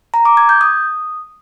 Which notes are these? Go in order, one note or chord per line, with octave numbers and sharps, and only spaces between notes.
A#5
D6
G#6
G6
D#6